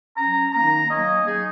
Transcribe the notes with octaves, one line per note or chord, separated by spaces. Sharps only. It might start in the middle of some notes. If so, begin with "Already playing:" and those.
F#3 C#4 A#5
D#3 A#3 D#4 A#5
F#3 A#3 C#4 D#5
F#3 A#3 D#4 G#4